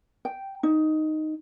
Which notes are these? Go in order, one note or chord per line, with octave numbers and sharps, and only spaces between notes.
G5
D#4